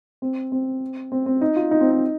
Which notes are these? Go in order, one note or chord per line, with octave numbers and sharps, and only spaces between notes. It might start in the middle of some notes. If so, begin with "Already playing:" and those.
C4
C4
C4
C4
D#4
F4
D#4
C4
D#4